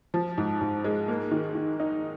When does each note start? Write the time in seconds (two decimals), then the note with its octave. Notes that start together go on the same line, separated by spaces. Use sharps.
0.14 F3
0.38 G#2
0.61 G#2
0.84 G#3
1.08 A#3
1.31 D#3
1.55 D#3
1.80 D#4